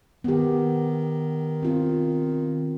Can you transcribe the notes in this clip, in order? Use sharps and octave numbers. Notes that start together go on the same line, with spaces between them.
D#3 B3 G4
C4 F4